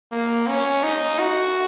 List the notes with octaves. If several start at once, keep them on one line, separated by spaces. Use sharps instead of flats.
A#3
C#4
D#4
F#4